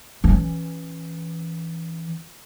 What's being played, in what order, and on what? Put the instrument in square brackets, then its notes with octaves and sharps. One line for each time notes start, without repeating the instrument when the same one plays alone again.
[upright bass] E3 C#4